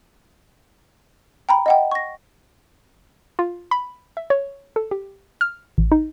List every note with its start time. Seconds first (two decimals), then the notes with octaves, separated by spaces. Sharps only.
1.49 G5 A#5 B5
1.66 D#5 F#5 G5
1.91 C#6 A#6
3.39 F4
3.71 B5
4.17 E5
4.30 C#5
4.76 A4
4.91 G4
5.41 F6
5.78 A1
5.92 D#4